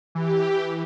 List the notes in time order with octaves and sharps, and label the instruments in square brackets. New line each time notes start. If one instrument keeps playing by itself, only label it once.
[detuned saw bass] E3 [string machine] G4